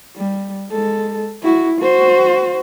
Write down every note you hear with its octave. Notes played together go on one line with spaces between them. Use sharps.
G3
G#3 A4
E4 F#4
F#4 C5